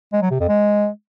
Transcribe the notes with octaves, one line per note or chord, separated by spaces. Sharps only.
G#3
F#3
C3
F2
G#3